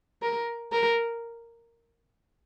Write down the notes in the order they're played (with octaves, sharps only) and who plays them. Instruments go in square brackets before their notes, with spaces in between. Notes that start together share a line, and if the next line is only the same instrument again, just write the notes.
[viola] A#4
A#4